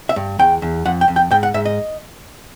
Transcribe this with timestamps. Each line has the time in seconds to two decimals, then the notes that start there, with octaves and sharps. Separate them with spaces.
0.09 E5
0.16 G2
0.39 E2 G5
0.62 E2
0.85 F2 F#5
1.01 G5
1.08 F2
1.16 G5
1.31 G#2 G5
1.43 F#5
1.54 G#2 E5
1.65 D#5